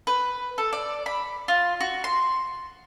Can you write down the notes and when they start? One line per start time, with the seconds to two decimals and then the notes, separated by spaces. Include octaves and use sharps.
0.07 B4
0.58 A4
0.73 D5
1.06 B5
1.48 F4
1.81 F#4
2.04 C6